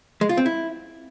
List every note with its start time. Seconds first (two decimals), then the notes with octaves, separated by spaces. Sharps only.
0.21 G#3
0.29 F4
0.37 C4
0.46 E4